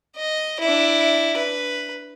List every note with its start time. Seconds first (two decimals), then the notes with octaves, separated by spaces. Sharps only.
0.16 D#5
0.60 D4 E4
1.36 B4